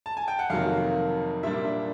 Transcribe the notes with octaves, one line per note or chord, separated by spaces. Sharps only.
A5
G#5
G5
F#5
F2 C3 D#3 F#3 A#3 F5
A#2 G3 A#3 D4 E5